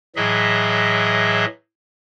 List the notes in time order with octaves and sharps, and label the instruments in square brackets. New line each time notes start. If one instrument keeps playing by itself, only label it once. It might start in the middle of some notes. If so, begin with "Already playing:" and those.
[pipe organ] A2 E3 F#3 G#4 D#5 E5